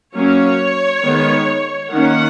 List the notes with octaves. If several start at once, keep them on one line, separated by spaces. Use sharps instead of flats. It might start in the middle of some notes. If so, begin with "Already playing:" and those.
F#3 A#3 C#4 C#5
D#3 G#3 B3
D#3 A#3 C#4 F#5